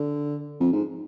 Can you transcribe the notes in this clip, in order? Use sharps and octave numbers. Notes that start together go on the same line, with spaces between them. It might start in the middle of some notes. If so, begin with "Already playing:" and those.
Already playing: D3
F2
G#2